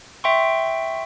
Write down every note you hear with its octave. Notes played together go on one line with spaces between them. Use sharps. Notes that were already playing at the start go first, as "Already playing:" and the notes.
E5 G5 C6 C#6